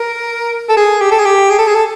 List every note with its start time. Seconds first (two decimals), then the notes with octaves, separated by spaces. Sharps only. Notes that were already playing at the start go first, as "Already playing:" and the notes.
Already playing: A#4
0.69 A4
0.77 G#4
1.01 G4
1.11 A4
1.19 G#4
1.25 G4
1.50 G#4
1.58 A4
1.67 G#4
1.75 A4